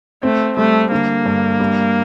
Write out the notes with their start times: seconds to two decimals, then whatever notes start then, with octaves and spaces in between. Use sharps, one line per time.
0.23 A3 C4
0.57 G3 A3
0.92 D3 A#3
1.25 G2
1.60 G3